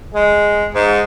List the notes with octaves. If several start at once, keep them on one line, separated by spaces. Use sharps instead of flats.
G#3
G#2